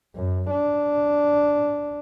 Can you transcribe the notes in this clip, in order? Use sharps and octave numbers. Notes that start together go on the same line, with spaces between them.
F#2
D4